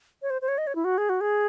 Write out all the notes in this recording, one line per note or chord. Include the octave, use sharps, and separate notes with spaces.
C#5
C5
C5
C#5
D#5
C#5
E4
F#4
G#4
F#4
G#4